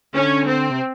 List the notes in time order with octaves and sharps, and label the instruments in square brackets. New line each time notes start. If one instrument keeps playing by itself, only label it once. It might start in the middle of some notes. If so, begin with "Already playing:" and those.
[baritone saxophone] D3 [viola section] C#4
[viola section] C4
[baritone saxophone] C3